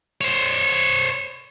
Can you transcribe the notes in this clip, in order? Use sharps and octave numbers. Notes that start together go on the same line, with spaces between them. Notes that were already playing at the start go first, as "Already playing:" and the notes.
C5 C#5